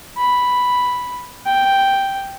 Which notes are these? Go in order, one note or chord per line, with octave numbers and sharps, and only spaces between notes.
B5
G5